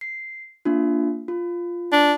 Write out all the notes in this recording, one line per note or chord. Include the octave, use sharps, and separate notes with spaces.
C7
A#3 D4 F4
F4
D4